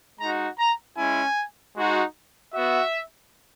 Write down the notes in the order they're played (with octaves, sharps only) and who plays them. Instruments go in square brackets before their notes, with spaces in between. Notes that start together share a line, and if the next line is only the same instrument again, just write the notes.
[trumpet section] G#3 D#4 F#4 A#5
A#5
G#3 C#4 E4 G#5
G#3 D#4 F#4
B3 F#4 E5